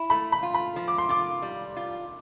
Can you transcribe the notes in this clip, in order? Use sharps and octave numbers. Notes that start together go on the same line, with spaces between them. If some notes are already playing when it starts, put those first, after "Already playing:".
Already playing: E4
A3 B5
B5
F4
B5
F3
D6
C6
F4 D6
G3
F4